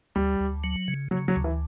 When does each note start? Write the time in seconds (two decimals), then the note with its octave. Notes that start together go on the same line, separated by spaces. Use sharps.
0.15 D2 G3
0.40 D2
0.64 F#3
0.88 C#3
1.11 C#3 F#3
1.28 F#3
1.36 D2
1.44 E3